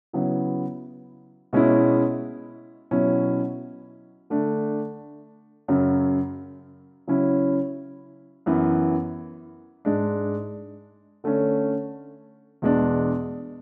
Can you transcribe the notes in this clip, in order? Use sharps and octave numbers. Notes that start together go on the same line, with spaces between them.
C#3 F#3 B3 E4
B2 G#3 C#4 E4
B2 F#3 C#4 E4
D3 A3 D4
F#2 C#3 F#3
C#3 F#3 C#4 E4
F#2 E3 B3
G#2 G#3 D4
D3 A3 C#4
E2 B2 G#3 D4